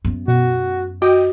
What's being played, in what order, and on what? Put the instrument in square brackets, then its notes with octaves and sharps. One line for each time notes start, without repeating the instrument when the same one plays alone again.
[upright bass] F#2 B3
[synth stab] B2 [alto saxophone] F#4
[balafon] F#4 [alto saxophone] D#5 [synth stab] G5